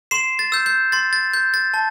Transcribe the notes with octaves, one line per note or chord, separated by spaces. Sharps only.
C6 C7 E7
A6
E6 G6
G6
C6 A6
A6
G6
A6
A5